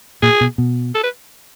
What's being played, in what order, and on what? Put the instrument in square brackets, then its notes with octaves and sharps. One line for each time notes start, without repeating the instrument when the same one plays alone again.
[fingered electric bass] A#2 [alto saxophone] G#4
[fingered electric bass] B2
B2
[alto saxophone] A4
B4